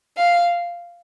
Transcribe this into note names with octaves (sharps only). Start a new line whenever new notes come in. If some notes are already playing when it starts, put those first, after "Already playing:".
F5